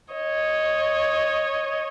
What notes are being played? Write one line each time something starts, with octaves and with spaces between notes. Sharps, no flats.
C#5 D#5